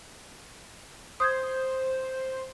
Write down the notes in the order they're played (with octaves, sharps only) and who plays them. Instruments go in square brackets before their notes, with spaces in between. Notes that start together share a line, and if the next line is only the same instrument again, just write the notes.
[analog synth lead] C5 [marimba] D#6 G6 G#6